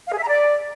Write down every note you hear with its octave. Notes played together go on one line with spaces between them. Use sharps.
F5
G#4
E5
A#5
D5